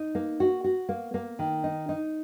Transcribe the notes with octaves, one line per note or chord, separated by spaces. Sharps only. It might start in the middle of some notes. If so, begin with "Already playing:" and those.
Already playing: D#4
A#3
F#4
F#4
A#3
A#3
D#3
D#4
D#4